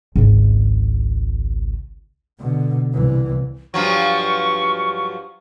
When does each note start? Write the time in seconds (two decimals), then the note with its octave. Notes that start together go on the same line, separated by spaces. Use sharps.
0.16 G#1 C#2
2.39 B2 D3
2.93 C2 E3
3.74 G2 F3 F#3 C#6